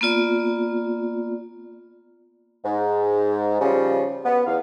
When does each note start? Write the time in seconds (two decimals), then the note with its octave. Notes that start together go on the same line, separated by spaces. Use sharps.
0.01 A#3 B3 F4 D5
2.65 G#2
3.61 C#3 F3 G3 C#4
4.25 B3
4.47 E2 F5